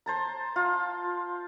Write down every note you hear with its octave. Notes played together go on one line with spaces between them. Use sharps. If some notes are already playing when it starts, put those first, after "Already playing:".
C5 A5 A#5
F4